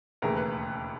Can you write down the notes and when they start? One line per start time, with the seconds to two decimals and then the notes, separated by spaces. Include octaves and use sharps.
0.22 E1 D#2 C#3 E3 A3 A#4
0.36 B4